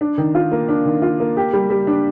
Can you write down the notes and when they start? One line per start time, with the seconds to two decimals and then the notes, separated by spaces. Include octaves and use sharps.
0.01 D4
0.18 D#3
0.35 F4
0.52 A#3
0.69 D4
0.85 D#3
1.02 F4
1.20 A#3
1.37 G4
1.53 G3
1.70 G3
1.87 D4